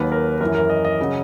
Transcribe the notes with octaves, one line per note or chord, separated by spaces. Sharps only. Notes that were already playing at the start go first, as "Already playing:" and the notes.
Already playing: D#2 D#3 F#3 B4
A#4
F#2 E3 A#4
A#4
D#5
D#5
C#3 F#3